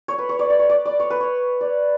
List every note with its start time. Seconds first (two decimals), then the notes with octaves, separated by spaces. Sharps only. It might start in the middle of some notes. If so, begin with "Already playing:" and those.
0.08 C#5
0.18 B4
0.29 C#5
0.39 D5
0.50 D5
0.59 C#5
0.70 D5
0.85 D5
1.00 C#5
1.10 B4
1.20 C#5
1.61 D5